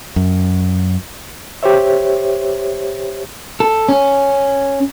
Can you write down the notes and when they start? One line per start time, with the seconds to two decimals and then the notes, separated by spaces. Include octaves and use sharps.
0.16 F#2
1.63 G4 C5 C#5 E5
3.60 A4
3.89 C#4